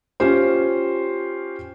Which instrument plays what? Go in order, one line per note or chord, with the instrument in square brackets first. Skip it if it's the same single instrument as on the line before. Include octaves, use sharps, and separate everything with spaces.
[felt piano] C#4 F4 G4 C5